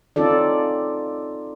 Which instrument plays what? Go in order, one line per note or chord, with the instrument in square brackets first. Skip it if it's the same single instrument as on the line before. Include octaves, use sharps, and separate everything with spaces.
[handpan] C4 C#4 D#4 F4 A4 D5